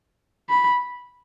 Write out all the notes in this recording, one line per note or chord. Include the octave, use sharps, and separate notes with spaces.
B5